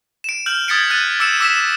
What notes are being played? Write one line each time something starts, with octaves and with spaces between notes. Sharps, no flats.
D7 E7
F6 G6 F#7
D#6 G#6 A6 B6 C#7 D7
F#6 G6 A6 D#7
D6 E6 C#7 D7 E7
D6 E6 B6 E7